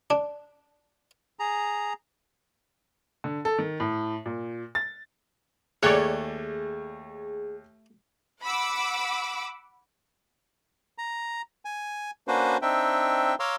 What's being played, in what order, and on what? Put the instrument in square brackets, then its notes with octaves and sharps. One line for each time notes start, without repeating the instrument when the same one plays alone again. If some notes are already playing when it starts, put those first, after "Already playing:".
[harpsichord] D4
[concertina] G#4 A#5
[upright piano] D3
A4
D#3
A2
A#2
A6
[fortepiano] D#2 F#6 [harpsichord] A3 [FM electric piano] G#4 [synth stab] C#5 D5
[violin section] F#5 B5 D6 E6
[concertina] A#5
G#5
A#3 C#4 D4 F#4 B4 C5
C4 D4 D#4 E5 G5
C#5 F5 A#5 C6 D6 E6